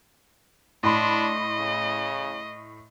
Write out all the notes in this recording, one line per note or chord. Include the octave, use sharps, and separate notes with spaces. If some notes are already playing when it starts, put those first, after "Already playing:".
A2 D4 D#5 B5 C6
C#3